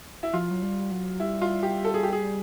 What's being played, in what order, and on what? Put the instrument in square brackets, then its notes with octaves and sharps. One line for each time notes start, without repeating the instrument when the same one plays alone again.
[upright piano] E4
[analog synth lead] F3 [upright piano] F4
[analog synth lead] F#3
G3
F#3
[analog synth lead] G3 [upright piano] E4
[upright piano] F4
G4
A4
G#4
G4
G#4